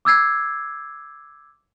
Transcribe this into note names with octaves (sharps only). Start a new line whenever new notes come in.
D6 E6 G#6 C7